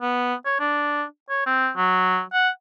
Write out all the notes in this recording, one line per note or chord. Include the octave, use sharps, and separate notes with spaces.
B3
C#5
D4
C#5
C4
F#3
F#5